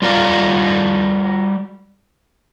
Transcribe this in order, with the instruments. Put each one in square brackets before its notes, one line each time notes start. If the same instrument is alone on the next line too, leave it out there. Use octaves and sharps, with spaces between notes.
[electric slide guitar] G3 F4 F#4 A#4 D5 F5